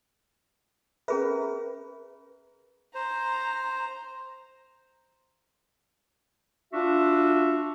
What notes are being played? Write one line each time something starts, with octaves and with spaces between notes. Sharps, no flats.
C#4 G#4 A#4 B4 E5
C5 A#5
D4 F4 F#4 E5